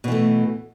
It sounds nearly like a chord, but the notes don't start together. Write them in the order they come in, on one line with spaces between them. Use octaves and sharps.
B2 E3 A3